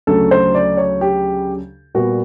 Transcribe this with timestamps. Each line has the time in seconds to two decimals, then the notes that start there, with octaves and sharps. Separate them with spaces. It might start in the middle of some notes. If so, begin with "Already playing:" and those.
0.07 D2 C#3 F#3 A3 A4
0.31 C5
0.54 D5
0.77 C#5
1.01 G4
1.95 A#2 G3 B3 F#4